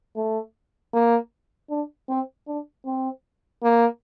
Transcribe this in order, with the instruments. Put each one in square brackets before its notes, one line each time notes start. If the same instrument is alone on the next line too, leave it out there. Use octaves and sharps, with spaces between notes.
[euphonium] A3
A#3
D4
C4
D4
C4
A#3